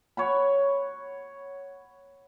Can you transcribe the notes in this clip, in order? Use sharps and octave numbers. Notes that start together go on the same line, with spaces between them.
C#5 F#5 B5